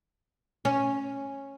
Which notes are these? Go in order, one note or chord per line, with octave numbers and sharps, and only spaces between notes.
C#4